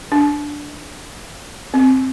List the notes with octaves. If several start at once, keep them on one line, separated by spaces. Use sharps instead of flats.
D4
C4